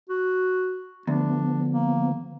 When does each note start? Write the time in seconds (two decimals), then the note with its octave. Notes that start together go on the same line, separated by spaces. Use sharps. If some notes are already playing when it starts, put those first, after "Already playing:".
0.09 F#4
1.07 D2 F3 B3 D4
1.69 A#3